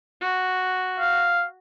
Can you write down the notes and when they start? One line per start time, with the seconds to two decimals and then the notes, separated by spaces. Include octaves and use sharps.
0.21 F#4
1.00 F5